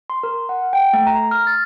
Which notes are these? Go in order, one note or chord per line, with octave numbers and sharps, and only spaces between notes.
C6
A#4
F#5
G5
A3
A#5
F6
A6